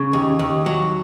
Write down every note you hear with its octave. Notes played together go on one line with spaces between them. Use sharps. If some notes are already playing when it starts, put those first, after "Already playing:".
Already playing: C#3
D#2
D#2
F#3